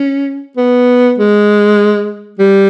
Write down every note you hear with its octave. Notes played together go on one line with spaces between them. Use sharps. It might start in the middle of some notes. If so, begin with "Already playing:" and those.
Already playing: C#4
B3
G#3
G3